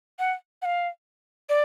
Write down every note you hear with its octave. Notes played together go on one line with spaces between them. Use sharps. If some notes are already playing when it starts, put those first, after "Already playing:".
F#5
F#5
F5
D5